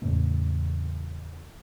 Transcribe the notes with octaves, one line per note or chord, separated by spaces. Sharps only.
E2 A2 C#3 A#3